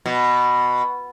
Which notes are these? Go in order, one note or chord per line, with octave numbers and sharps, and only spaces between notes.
B2